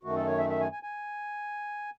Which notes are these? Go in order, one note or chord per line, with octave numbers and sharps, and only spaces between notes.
F#2 D#3 A3 F#4
A4
C#5
E5
E5
G#5
G#5
G#5